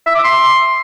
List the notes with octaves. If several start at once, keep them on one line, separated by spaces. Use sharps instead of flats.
E5
D6
C6